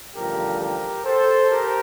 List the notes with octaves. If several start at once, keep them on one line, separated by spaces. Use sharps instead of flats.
A1 G2 D3 F3 G4 A#4
G4 A#4
A4 C5
G4 A#4